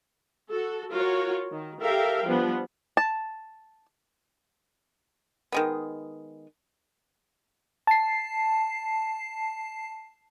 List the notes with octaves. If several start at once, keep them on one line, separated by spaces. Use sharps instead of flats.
F#4 A4
F4 F#4 A#4 C#5
D#3
G4 A4 A#4 E5 F5 G5
F3 G3 B3 D4
A5
D#3 G#3 B3
A5 C7